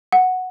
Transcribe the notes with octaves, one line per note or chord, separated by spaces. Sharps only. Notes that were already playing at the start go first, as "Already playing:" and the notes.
F#5